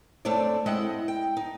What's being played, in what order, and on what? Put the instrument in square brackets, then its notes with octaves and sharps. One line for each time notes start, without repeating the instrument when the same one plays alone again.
[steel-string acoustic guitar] F#2 A3 C4 D4 D5
G#3 C4 E4 D#5 F#5
G5
D#4